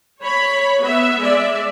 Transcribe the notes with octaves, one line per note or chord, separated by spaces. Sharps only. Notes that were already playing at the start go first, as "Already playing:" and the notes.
C#5 B5
B3 E5
G#3 D5 E5